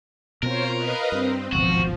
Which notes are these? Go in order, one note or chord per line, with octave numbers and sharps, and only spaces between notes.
B2 C4 F4 A#4 C5 C#5
B4 D#5 F5
G2 C4
D1 G#1 B2 F3 F#4